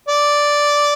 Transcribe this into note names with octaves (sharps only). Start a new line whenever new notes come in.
D5